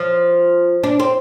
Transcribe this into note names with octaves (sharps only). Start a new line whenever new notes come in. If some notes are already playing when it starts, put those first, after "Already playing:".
Already playing: F3
D4
C4